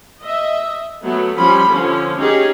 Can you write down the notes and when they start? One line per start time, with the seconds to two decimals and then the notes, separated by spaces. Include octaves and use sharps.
0.21 D#5 E5
1.03 F#3 A3 B3
1.38 F3 G3 C#4 B5 C6
1.67 D3 F3 C#4
2.18 C#4 D#4 G4 G#4